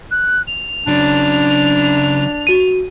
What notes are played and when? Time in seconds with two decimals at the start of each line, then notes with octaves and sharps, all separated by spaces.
0.11 F#6
0.47 F7
0.87 C#3 F#3 D4
2.47 F#4 D#7